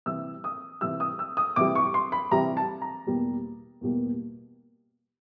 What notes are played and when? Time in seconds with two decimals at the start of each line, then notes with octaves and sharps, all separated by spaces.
0.06 C3 E3 G3 E6
0.44 D#6
0.81 C3 E3 G3 E6
1.00 D#6
1.19 E6
1.37 D#6
1.56 C3 E3 G3 D6
1.75 C#6
1.94 C6
2.12 B5
2.31 C3 E3 G3 A#5
2.57 A5
2.82 A#5
3.06 E2 B2 G3 A#3
3.81 E2 B2 G3 A#3